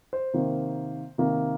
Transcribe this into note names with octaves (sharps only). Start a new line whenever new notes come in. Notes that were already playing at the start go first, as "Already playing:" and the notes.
C5
C3 D#3 A#3
C3 D#3 A#3